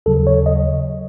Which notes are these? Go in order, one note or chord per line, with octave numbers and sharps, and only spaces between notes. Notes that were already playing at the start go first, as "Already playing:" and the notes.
D#2 C#3 F#3 A4
C#5
D#5